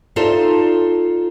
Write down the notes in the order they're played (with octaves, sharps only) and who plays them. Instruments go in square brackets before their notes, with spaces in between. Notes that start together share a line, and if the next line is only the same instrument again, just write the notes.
[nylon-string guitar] D#4 F4 A4 C5 D5 E5